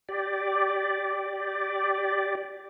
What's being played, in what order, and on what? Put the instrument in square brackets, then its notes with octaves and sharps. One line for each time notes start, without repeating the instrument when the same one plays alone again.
[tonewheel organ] G4 D5